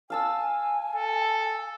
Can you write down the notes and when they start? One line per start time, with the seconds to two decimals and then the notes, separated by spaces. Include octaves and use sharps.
0.10 F5 G#5 A5 E6
0.96 A4